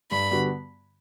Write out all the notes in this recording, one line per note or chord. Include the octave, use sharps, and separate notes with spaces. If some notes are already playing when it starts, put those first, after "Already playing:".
G2 B5
D3 G3 B3 F#4